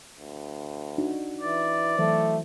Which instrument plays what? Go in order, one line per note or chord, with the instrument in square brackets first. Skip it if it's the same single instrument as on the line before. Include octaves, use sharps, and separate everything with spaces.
[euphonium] D2
[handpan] D4 D#4 F#4
[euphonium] E3 [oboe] D5
[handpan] E3 F#3 C5 [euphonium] A3